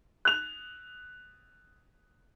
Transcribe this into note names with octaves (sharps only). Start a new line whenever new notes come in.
F#6 F7